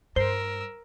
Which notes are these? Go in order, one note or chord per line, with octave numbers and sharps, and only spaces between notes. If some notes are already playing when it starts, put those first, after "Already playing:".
G2 A#4 C5 E6